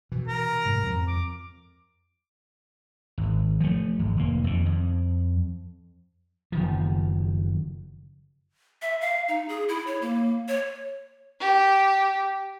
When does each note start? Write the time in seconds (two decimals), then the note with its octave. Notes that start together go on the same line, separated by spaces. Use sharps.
0.12 B2 E3
0.28 A#4
0.65 G#2 C3
0.83 F2 F3
1.08 D6
3.18 G#1
3.60 F3 A3
3.99 G#1
4.17 F1 A#3
4.44 F2 D#3
4.66 F2
6.52 F#1 D#3 F3
8.82 E5
9.01 F5
9.28 D#4
9.49 G#4
9.69 E4
9.87 C#5
10.02 A#3
10.48 C#5
11.40 G4